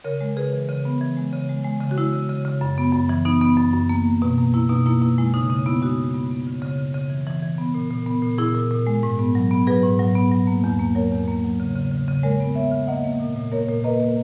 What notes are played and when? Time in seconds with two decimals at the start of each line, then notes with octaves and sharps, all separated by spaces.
0.04 C#3 A#4 C#5
0.21 G#3
0.36 C#3 G#4 B4
0.53 E3
0.69 C#3
0.85 B3
1.01 E3
1.17 G#3
1.33 C#3
1.49 G#3
1.64 G#3
1.81 C#3
1.91 F#4
1.97 G#3 E4
2.13 C#3
2.29 C#3
2.45 C#3
2.61 F#2
2.78 B3
2.93 F#2
3.09 E3
3.25 B3 D#4
3.41 B3
3.57 F#2
3.74 F#2
3.89 A#3
4.06 A#3
4.22 B2
4.38 A#3
4.53 A#3 E4
4.69 B2 D#4
4.86 A#3 E4
5.02 B2 E4
5.18 G#3 E4
5.34 C#3 D#4
5.50 C#3 D#4
5.66 B3 E4
5.82 G#3 D#4 F#4
5.98 C#3
6.14 B3
6.30 B3
6.47 C#3
6.62 C#3
6.79 C#3
6.94 C#3
7.10 E3
7.27 E3
7.43 E3
7.58 B3
7.74 A#2
7.91 A#2
8.07 B3
8.23 A#2
8.38 A#2 E4 G#4
8.55 A#2
8.71 A#2
8.87 G#3
9.03 G#2
9.19 B3
9.35 F#3
9.51 B3
9.67 F#3 G#4 B4
9.83 G#2
9.99 F#3
10.15 B3
10.31 F#3
10.47 A#3
10.64 E2
10.80 A#3
10.95 F#3 A#4 C#5
11.12 E2
11.28 A#3
11.44 F#3
11.60 C#3
11.75 C#3
11.91 C#3
12.08 C#3
12.23 G#3 A#4 C#5
12.40 B3
12.55 B3 C#5 E5
12.72 C#3
12.87 A#3 D#5 F#5
13.04 A#3
13.20 A#2
13.36 A#2
13.52 A#3 A#4 C#5
13.69 A#2
13.84 A#3 B4 D#5
14.00 A#3